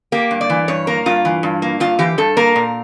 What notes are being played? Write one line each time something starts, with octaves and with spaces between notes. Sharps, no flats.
A#3 G4
G2
D5
E3
G2 C#5
A#3 A#4
G2 F4
E3
G2
A#3
G2 F4
E3 G4
G2 A4
A#3 A#4
A#2